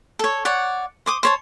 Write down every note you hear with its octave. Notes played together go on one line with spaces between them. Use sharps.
A4 C#5
C#5 D5 F#5
C5 D6 D#6
C5 C#5 A5